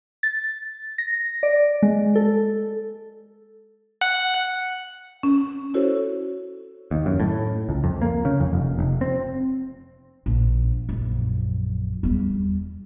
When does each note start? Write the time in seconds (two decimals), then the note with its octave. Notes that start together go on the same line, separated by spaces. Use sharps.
0.23 A6
0.98 A#6
1.43 D5
1.83 G#3
2.15 A4
4.01 F#5
5.23 C#4
5.74 C#4 E4 F#4 A4 C5 C#5
6.91 D#2
7.06 F#2
7.20 A2
7.69 C#2
7.84 F2
8.02 A#3
8.25 C#3
8.40 F2
8.53 F1
8.79 F1
9.01 C4
10.26 A#1
10.89 A#1 F#2
12.03 E2 G3